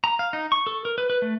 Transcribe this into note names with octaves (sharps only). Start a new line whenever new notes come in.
A#5
F5
D#4
C#6
A4
A#4
B4
B4
A3